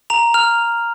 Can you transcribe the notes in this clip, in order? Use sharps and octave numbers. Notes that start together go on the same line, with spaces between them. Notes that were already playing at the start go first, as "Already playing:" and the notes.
A#5 F7
F6 F7